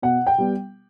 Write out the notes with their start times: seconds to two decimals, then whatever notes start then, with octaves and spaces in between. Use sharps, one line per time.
0.02 B2 F#5
0.27 G5
0.38 G3 B3